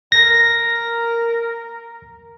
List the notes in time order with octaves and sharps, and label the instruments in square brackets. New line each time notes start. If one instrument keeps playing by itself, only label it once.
[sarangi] A#4 [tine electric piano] A#6